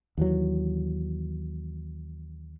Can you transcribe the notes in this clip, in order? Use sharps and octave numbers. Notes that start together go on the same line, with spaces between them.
D#2 E3 F#3